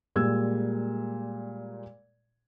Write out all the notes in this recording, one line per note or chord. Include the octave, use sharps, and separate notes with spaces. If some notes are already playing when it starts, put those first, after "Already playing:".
A#2 G3 G#3 E6 G#6